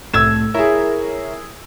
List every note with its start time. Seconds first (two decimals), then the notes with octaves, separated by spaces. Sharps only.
0.14 C2 A2 A3 E6 G#6 E7
0.54 E4 G#4 A#4 C#5 E5